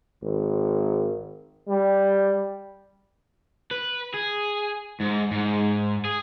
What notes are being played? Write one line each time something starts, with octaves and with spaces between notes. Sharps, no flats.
G#1
G3
B4
G#4
G#2
G#2
G#4